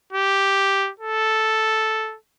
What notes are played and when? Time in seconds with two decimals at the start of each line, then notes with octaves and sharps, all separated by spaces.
0.12 G4
0.99 A4